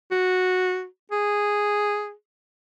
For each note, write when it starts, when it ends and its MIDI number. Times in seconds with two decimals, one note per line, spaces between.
0.11 0.85 66
1.12 2.12 68